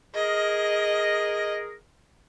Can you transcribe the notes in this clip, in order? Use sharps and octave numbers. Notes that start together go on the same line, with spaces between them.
G#4 A#4 D#5